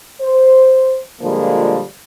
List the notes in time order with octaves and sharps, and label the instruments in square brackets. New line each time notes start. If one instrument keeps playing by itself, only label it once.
[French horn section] C5
A#2 D3 F3 G3 G#3 A#3